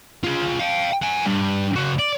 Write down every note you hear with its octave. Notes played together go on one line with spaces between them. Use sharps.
F4 G#4
F5 G5
F#5 G#5
G2
C#3 F#4
D5